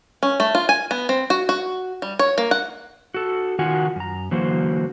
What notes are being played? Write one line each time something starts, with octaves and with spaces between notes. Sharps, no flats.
C#4
A3
F4
G#5
B3
C4
F#4
F#4
G3
C#5
A#3
F#5
F#4 A4
D#3 F4 F#4 F#5 G#5
F#2 A#5
D3 E3 F#3 A#3 F#4 C5